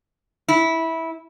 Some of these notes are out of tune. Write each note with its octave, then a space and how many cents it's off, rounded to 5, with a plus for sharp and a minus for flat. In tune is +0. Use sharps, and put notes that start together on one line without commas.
E4 -15